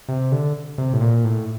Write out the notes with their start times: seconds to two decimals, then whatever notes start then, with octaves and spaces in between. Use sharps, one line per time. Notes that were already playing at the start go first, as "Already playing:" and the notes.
0.09 C3
0.32 D3
0.78 C3
0.93 A2
1.01 A#2
1.24 A2